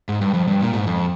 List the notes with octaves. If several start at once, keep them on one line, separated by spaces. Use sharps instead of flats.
G#2
G2
F2
G2
A#2
G#2
F2